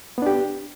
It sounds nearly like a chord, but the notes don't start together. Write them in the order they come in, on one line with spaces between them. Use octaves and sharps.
B3 D4 G4